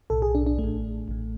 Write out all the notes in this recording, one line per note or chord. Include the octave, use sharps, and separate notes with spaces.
B1 A2 A4
G#4
D4
D4
A1 A3
A2
A1 A2